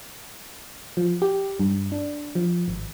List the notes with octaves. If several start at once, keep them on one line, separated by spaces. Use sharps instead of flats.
F3
G4
G2
D4
F3
G#1